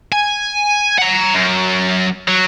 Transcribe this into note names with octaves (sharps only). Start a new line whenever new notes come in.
G#5
F#5 A#5
F#2
F#3